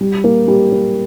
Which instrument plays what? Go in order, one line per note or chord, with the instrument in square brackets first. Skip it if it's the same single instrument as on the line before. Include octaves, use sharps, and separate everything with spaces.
[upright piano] G3
A#3
G3
A#3